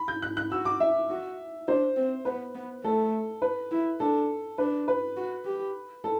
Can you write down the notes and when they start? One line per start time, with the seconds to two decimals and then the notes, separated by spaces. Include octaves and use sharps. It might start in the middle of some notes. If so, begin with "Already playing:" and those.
Already playing: B5
0.08 G6
0.22 F#6
0.37 F#6
0.51 F#4 E6
0.65 D6
0.80 E5
1.09 F#4
1.68 D4 C5
1.97 C4
2.25 B3 B4
2.55 B3
2.84 A3 A4
3.42 B4
3.71 E4
4.00 D4 A4
4.58 D4 B4
4.88 B4
5.17 F#4
5.46 G4
6.04 A4